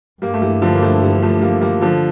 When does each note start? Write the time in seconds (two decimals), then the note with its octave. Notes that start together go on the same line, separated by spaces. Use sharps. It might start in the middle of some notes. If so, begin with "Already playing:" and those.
0.22 G2 G3 A#3
0.34 A3
0.42 E3 G3
0.62 D3 F3
0.75 A#3
0.82 F3 A3
1.02 E3 G3
1.22 F3 A3
1.41 G3 A#3
1.61 G3 A#3
1.81 D3 F3